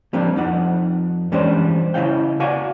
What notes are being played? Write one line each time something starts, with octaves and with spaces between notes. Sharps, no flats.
F3 G3 A#3 C4 D4
F2 D#4 F#5
E3 G3 G#3 C#4 D4 C5
C#3 A#3 E4 D#5 F5 G5
F#4 D5 F5 F#5 G#5